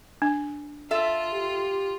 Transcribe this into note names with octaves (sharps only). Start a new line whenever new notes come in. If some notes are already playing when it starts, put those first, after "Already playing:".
D4
F4 A4 E5
G4